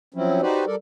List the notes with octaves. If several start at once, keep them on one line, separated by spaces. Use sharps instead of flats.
F3 F#3 C4 C#4 E4
D#4 F#4 G4 B4 C5 D5
G3 A4 A#4 D5